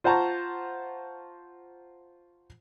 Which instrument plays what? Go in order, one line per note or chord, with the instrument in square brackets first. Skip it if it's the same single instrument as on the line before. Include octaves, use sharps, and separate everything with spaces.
[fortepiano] F4 C5 F#5 A5 A#5 C#6